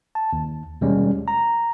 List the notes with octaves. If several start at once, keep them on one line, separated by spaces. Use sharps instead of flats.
A5
D#2
D#2 B2 G3 G#3 C#4
A#5